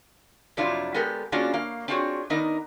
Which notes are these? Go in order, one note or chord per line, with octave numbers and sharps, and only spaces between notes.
F2 C3 F#3 D4 E4 F4
G#3 B3 G4 A4 A#4
A#3 C#4 D4 F4 F#4 G#4
A#3 F5
C4 D4 F4 F#4 G#4 C#5
D#3 B3 D4 D#4 A#4 D#5